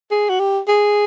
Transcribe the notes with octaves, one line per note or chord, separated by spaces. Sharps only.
G#4
F#4
G4
G#4